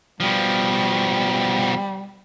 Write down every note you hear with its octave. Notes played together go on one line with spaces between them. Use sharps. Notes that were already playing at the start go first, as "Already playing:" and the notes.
B2 F3 G3